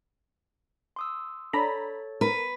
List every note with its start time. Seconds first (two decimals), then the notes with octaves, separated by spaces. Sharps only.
0.96 C6 D#6 E6
1.53 D4 A4 C#5 A#5 B5 A6
2.21 A#4 B4